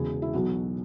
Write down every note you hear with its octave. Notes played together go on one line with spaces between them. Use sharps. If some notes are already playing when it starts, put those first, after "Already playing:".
Already playing: E1 E2 C#3 G#4
E4
B1 B2 F#3 F#4